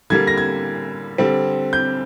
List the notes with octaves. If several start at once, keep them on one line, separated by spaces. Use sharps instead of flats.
D3 G3 A#3 G#6
A#6
G#6
D3 G3 C4
G6